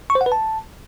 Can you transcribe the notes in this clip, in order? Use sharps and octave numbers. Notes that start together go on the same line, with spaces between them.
C#6
C5
F#5
B4
A5